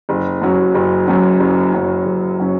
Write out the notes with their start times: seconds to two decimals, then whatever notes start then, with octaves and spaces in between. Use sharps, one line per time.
0.09 F#1
0.42 F#2 F#3 C#4
0.75 F#1
1.07 F#2 F#3 C#4
1.40 F#1
1.72 F#2 F#3 C#4
2.05 F#1
2.39 F#3 C#4